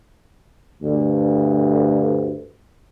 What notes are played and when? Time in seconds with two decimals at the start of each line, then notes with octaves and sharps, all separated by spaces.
0.82 D2 G2